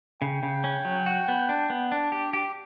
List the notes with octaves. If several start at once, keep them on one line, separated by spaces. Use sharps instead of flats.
C#3 G5
C#3
C#4
F#3
F#4
B3
D4
B3
D4
G4
G4